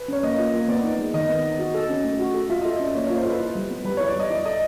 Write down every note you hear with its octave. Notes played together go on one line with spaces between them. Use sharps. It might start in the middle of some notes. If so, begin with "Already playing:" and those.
Already playing: B4
C#4 C#5
A#3 D#5
F4
A#3
B3 D5
D#4
G#3
D#3 D#5
B3
D#4
F#4
A4
C#4
A3
F#4
A4
F4 E5
D#5
A4
D#5
C#4 D5
A#3 C#5
F4 C#5
C5
A4 B4
E4
G3
B3
G3 B4
E4 C#5
D5
G3 D#5
E4 D5
A4 D#5